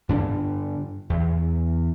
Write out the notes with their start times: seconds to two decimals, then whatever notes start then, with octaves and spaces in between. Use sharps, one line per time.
0.09 G2 D3 D4
1.10 E2